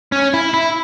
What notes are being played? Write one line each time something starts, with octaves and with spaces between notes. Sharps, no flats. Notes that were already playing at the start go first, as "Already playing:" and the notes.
C#4
E4
E4